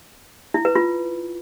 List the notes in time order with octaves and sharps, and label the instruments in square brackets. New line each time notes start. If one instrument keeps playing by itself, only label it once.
[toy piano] E4
B4
F4